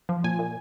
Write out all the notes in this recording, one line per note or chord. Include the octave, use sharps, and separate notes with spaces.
F3
A#2 G#5
A#2